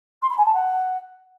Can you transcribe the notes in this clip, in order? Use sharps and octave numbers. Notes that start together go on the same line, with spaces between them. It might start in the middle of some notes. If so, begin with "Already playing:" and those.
C6
B5
G#5
A5
F#5